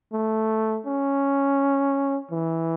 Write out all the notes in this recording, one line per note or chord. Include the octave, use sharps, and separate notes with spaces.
A3
C#4
E3